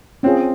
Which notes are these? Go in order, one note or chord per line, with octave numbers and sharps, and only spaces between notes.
C4 C#4 F4 G#4